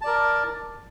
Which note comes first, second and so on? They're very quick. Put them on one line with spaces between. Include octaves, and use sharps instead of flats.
A5 D5 A#4